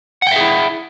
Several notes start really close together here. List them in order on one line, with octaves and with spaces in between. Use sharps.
F#5 G5 E5 G#4 E4